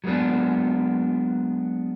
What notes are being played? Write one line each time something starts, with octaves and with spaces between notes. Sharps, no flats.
F#3 G#3 A#3 B3 D4